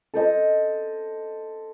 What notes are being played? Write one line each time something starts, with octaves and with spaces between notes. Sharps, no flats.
A4 C5 D#5